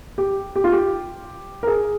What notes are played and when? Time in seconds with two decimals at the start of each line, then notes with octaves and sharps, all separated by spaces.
0.18 G4
0.56 G4
0.64 F4
0.72 G4
1.63 A#4
1.67 G#4